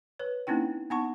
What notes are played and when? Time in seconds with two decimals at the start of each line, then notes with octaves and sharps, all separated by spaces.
0.19 B4 C#5
0.47 A#3 C4 C#4 D#4 E4 G5
0.90 B3 D#4 F#5 A5 C#6